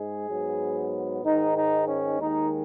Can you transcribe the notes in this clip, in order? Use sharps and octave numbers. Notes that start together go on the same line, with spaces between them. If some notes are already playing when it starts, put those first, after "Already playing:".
Already playing: G#2 G#3 G#4
G#2 F#3 B3
G#2 D#3 G#3 D#4
D#4
C#4
D#2 D#3 G#3 D#4